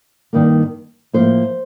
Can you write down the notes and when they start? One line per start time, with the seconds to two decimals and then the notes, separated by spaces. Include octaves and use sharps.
0.33 G2 D#3 A#3
1.13 A2 F3 A#3 C5